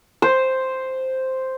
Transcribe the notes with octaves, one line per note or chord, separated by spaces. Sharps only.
C5